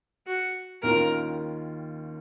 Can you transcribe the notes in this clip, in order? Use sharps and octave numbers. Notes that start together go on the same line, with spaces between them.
F#4
D#2 D#3 A#3 C#4 F4 A#4